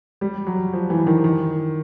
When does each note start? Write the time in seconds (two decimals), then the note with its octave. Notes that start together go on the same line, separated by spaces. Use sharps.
0.21 G3
0.47 F#3
0.73 F3
0.90 E3
1.07 D#3
1.24 D#3